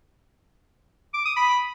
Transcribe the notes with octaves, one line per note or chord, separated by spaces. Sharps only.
D6
D#6
B5